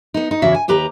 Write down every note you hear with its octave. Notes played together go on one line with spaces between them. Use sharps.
B3 D#4
D#4
E2 C#3 F#4 E5
G#5
D#2 G4 B4 A#5